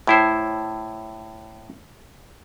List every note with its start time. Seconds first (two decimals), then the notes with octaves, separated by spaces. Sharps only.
0.07 A2 E4 C5